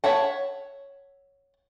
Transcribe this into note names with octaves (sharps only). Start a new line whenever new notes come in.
C#5 E5 F#5 A5